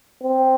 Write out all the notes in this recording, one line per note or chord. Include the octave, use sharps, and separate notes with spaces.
C4